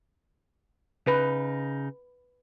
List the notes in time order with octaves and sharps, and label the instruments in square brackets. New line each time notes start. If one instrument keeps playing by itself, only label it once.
[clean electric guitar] C#3 D#4 [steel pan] B4